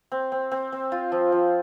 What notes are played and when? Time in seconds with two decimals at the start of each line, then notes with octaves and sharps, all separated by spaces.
0.12 C4
0.32 C4
0.52 C4
0.72 C4
0.92 F4
1.12 F3
1.32 F3